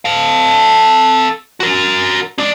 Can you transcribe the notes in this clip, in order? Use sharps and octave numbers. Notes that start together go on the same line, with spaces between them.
A4 F5
F#4 A#4
D#4 D5